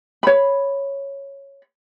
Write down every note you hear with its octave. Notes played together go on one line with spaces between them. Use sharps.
C#5 B5